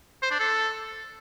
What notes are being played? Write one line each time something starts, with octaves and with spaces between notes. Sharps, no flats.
C5
D4
A4